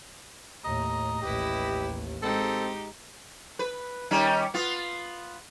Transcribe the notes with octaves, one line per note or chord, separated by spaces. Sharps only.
D#2 A2 D#5 A#5
A1 D#2 E4 G4 B4
G#3 C4 D#4 G4 A4
B4
D#3 G3 C#4
B3 F4